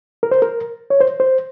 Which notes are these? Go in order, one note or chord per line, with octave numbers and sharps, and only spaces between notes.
A#4
C5
A#4
C#5
C5
C5